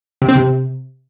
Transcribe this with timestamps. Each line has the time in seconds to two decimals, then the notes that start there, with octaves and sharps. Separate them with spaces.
0.22 C3
0.28 C4
0.35 C3